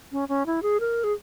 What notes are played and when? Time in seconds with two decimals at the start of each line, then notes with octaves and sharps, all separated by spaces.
0.12 C#4
0.29 C#4
0.46 E4
0.62 G#4
0.80 A#4
1.04 G#4